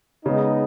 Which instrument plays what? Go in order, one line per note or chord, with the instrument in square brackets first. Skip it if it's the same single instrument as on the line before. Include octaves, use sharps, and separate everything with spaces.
[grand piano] C#3 [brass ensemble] G#3 B3 D#4